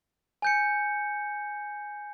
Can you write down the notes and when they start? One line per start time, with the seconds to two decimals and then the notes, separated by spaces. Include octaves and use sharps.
0.42 G#5 G6 C#7